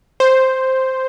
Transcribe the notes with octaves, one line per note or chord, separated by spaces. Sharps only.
C5